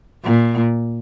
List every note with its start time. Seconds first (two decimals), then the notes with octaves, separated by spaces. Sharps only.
0.24 A#2